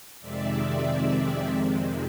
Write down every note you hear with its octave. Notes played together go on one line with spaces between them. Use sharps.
F2 C3 D#3 G#3 C4 D5 E5